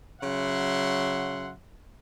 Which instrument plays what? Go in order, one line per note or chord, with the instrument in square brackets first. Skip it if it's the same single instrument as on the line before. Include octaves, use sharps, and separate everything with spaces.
[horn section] C#3 F#3 E5 F#5 C6